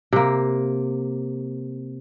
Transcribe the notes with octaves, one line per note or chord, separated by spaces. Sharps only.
C3 A#3